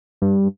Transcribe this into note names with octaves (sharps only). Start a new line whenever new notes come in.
G2